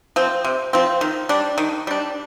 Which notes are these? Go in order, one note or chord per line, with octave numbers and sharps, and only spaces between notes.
F3 C4
C3
F3 C4
D#3
G3 D4
D#3
G3 D4